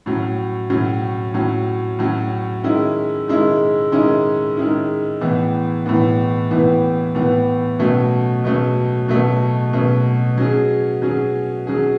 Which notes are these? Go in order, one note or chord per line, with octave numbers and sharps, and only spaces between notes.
A2 F#3 C#4
A2 F#3 C#4
A2 F#3 C#4
A2 F#3 C#4
D#3 G#3 C#4 E4
D#3 G#3 C#4 E4
D#3 G#3 C#4 E4
D#3 G#3 C#4 E4
A2 E3 B3
A2 E3 B3
A2 E3 B3
A2 E3 B3
B2 F#3 A3 C#4
B2 F#3 A3 C#4
B2 F#3 A3 C#4
B2 F#3 A3 C#4
F#3 C#4 G#4
F#3 C#4 G#4
F#3 C#4 G#4